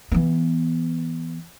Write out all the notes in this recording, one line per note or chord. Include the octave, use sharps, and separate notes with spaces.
E3 B3